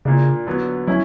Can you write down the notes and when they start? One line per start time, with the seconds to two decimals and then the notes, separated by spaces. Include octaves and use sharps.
0.05 A#2 C#3 A#3 D4
0.47 D3 F#3 B3
0.87 F#3 C#4 E4